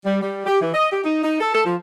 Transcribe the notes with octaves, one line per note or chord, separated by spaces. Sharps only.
G3
G3
G4
E3
D#5
G4
D#4
D#4
A4
A4
F3